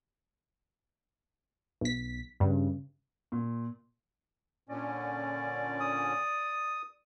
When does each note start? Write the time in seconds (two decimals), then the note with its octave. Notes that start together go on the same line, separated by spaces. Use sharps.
1.81 B1 B6
2.40 G2 C#3
3.32 A#2
4.69 A#2 D3 C#4 D5
5.80 D#6